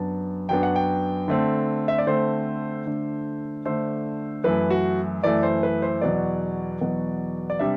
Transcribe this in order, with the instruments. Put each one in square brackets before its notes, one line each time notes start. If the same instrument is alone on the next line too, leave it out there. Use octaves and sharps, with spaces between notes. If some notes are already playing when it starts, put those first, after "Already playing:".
Already playing: [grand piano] F#2 F#3 B3 D4 A5
F#2 F#3 B3 D4 G5
F#5
G5
D3 A3 C4
E5
D5
D3 A3 C4 C5
D3 A3 D4
D3 A3 D4 C5
F#2 E3 A3 E4 B4
F#4
F#2 E3 A3 E4 D5
C5
B4
C5
E2 B2 F#3 B3 D5
E2 B2 F#3 B3
D5
C3 G3 D4 E5